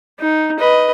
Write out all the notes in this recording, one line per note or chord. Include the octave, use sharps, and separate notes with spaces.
D#4
B4 D#5